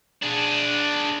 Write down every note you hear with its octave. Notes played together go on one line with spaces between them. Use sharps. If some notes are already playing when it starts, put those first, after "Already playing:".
D4 G#4